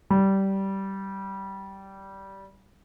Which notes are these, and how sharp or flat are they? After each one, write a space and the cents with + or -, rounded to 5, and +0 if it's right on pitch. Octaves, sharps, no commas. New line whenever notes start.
G3 -15